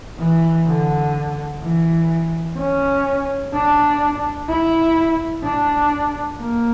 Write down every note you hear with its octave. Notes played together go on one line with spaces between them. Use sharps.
E3
D3
E3
C#4
D4
E4
D4
A#3